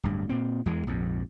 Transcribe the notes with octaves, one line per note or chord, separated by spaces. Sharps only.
D1 G2
A#2 C4
E2 E3 G#3
A#1 F2 G#2